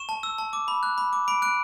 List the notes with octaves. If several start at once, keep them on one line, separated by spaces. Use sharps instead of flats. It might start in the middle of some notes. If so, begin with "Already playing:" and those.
Already playing: C#6 E7
A5
E6
A5
D6
B5
F#6
B5
D6
B5 D7
F#6 D7